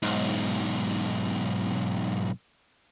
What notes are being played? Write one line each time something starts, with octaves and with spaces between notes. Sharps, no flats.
B1 G#2